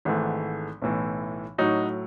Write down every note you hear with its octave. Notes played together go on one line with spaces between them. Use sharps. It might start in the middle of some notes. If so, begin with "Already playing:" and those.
G#1 G#2 E3 A3
B1 A2 E3
A2 F#3 D#4 F#4